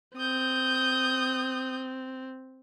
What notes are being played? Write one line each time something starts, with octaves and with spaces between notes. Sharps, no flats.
C4 D#6 G6